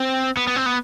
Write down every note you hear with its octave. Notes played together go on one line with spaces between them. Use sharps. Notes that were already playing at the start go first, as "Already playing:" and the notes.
Already playing: C4
B3
B3
C4
B3